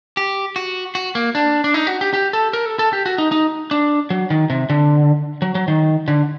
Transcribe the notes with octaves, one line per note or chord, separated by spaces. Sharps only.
G4
F#4
F#4
A#3
D4
D4
D#4
F#4
G4
G4
A4
A#4
A4
A4
G4
F#4
D#4
D#4
D4
F#3
D#3
C3
D3
F#3
F#3
D#3
D3